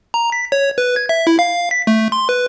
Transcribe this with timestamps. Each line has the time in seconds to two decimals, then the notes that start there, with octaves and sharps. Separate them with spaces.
0.14 A#5
0.32 B6
0.52 C#5
0.78 B4
0.96 G#6
1.09 E5
1.27 E4
1.39 F5
1.71 B6
1.87 A3
2.12 C6
2.29 B4